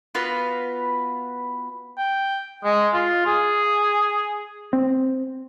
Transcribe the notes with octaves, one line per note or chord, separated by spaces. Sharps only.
B3 F4 F#4 B4
G5
G#3
F4
G#4
C4